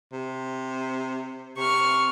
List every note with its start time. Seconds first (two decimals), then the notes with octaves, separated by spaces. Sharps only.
0.12 C3
1.57 C3 C#6 F6